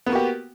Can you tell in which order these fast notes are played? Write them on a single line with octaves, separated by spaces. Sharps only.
B3 A#3 F#4 G4